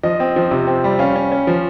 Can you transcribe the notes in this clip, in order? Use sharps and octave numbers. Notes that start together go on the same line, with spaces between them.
F3 D#5
C4
F3
C3
C4
G3
C#4 F5
C#4
C#4
F3